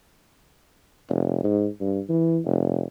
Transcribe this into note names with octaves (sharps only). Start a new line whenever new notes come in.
F1
G#2
G2
E3
F1